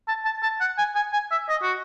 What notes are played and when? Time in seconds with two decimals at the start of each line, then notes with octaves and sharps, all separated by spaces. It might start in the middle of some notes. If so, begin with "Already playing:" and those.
0.08 A5
0.25 A5
0.43 A5
0.61 F#5
0.78 G#5
0.96 G#5
1.13 G#5
1.31 E5
1.49 D#5
1.62 F#4